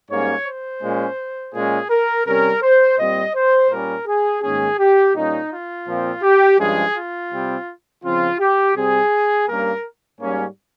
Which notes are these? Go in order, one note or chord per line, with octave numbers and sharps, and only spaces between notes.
G#2 G3 A#3 C#4 C#5
C5
A#2 G#3 C#4
A#2 G#3 C#4 G#4
A#4
C3 G3 C#4 A#4
C5
A#2 G3 C4 D#5
C5
A#2 G3 C#4 A#4
G#4
G#2 D#3 A#3 C#4 G#4
G4
A#2 G3 C#4 D#4
F4
A#2 F3 C4
G4
G2 F3 G#3 C#4 G#4
F4
C3 G3 C4
C#3 F3 C4 F4
G4
C3 G3 C4 G#4
G2 G3 A#3 C#4 A#4
G#2 G3 A#3 C#4